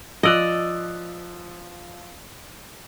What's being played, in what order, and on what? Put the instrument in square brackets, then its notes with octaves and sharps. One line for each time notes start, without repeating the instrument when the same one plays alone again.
[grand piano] F3 E6 F#6 [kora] D5 D#5